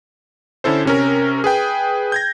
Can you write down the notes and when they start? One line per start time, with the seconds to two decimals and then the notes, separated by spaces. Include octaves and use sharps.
0.64 D3 C#4 E4 A4 C5
0.85 C3 C#4 A#4
1.44 G#4 B4 G5
2.12 G6 G#6 A#6